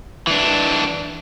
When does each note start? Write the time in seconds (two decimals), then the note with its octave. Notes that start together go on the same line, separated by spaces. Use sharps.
0.27 E3 D4